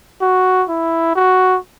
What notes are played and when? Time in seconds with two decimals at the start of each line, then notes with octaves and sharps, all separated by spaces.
0.21 F#4
0.69 E4
1.15 F#4